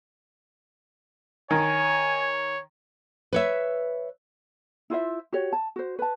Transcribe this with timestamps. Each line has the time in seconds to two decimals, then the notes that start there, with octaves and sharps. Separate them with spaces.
1.51 D#3 C#5 G#5
3.33 B4 C#5 E5
4.90 E4 F4 C5 E5
5.33 F#4 G4 C#5
5.53 A5
5.76 F#4 C5
5.99 B4 A5